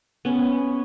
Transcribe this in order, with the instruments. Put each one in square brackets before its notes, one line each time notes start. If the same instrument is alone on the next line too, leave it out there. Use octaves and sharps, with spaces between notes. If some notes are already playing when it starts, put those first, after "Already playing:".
[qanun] B3 C#4